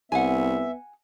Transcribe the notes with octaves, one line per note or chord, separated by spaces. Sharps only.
C2 B3 E5 F#5 G#5